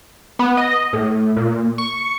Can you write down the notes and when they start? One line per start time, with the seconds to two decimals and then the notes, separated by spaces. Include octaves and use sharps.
0.39 B3
0.57 D#5
0.93 A2
1.36 A#2
1.78 C#6